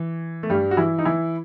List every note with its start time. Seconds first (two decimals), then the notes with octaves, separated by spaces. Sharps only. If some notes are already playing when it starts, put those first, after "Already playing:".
Already playing: E3
0.43 A3
0.50 G2 G3
0.71 F#4
0.77 E3 E4
0.99 D#4
1.05 E3 E4